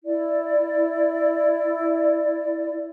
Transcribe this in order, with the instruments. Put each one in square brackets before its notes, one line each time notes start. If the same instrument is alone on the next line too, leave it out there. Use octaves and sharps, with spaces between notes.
[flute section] E4 D5